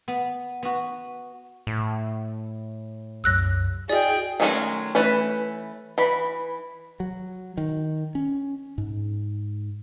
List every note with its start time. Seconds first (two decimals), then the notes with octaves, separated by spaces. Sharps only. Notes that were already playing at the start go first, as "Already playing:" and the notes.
0.08 B3
0.63 B3 F#4
1.67 A2
3.24 C2 F#2 E6 F#6 A#6
3.89 E4 F#4 G#4 D5 D#5 G5
4.40 D#3 F#3 G#3 A3 C#4
4.95 E3 A3 C#4 B4
5.98 E3 B5
7.00 F#3
7.57 D#3
8.15 C#4
8.78 G#2